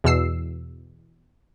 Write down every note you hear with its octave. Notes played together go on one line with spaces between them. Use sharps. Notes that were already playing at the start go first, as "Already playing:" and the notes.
E2 B2 E6 C7